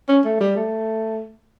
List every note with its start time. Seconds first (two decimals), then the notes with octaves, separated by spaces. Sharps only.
0.08 C#4
0.24 A3
0.40 G3
0.56 A3